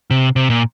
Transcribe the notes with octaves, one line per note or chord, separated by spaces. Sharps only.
C3
C3
A#2